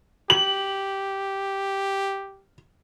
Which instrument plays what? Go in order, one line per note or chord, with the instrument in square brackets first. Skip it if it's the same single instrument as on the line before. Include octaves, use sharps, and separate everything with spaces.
[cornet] G4 [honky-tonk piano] F#7